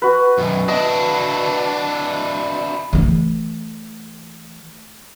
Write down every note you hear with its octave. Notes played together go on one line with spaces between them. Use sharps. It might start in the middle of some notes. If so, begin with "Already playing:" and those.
F#4 B4
B1 F#2
D4 E4 D#5
E3 A3